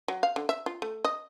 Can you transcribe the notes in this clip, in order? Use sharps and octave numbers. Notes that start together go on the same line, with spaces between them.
F#3
F5
D3
E5
F4
A3
D#5